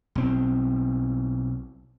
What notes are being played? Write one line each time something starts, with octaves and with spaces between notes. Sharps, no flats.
B1 C4